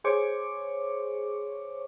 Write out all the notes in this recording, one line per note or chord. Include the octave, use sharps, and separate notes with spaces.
G#4 C5 C#5 C#6 D6